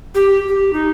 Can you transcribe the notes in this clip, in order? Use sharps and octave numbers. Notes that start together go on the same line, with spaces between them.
G4
G4
D#4